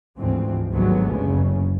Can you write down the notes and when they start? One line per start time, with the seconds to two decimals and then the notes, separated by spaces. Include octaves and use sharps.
0.18 D2 G#2 E3 F3 C4
0.73 G#1 D2 G2 F#3 G#3 B3
1.14 F#1 C#3